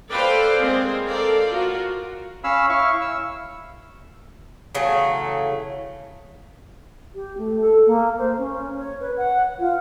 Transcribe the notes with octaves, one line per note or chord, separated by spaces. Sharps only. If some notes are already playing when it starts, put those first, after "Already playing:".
A4 B4 C5 D5 F5 G5
G#3 C4 G#4 A#4 C5
A4 A#4 C5 D5 F5
F4 F#4 A#4
C#4 C#5 F5 B5 E6
E4 F5 C#6
E6
C#3 E3 F#3 A3
G4
A3
A4
A#3
C5
C#4
C#5
B4
F#5
F4